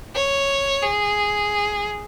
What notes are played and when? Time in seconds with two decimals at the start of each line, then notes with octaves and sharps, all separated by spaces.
0.15 C#5
0.82 G#4